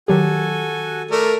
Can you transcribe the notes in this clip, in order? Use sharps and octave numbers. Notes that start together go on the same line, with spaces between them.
D#3 F#3 F#4 G4 A4 G#5
A3 A#4 D5